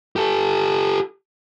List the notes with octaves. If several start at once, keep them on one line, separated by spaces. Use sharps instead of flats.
G4 A4